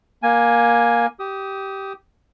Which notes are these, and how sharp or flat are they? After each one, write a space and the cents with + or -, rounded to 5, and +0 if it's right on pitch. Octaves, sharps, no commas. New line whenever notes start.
A#3 +15 G#5 +0
G4 -10 D#6 +15